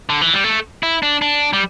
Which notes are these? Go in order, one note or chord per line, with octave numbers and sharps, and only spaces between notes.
D3
E3
G3
A3
E4
D4
D4
G3